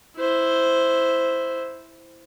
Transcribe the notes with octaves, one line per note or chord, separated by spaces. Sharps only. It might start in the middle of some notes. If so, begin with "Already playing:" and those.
E4 C5